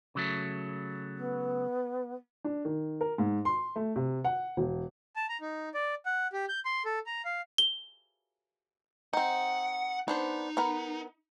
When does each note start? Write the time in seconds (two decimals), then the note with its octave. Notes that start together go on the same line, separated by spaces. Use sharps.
0.15 C#3 F#3 A3
1.16 B3
2.44 D4
2.65 D#3
3.01 A#4
3.18 G#2
3.45 C6
3.76 A3
3.96 C3
4.24 F#5
4.57 E1
5.16 A5
5.29 A#5
5.41 D#4
5.74 D5
6.06 F#5
6.33 G4
6.49 G6
6.65 C6
6.85 A4
7.06 A#5
7.25 F5
7.58 G7
9.13 C4 D#4 F#5
10.08 B3 D4 D#4 C5
10.57 B3 A#4 B4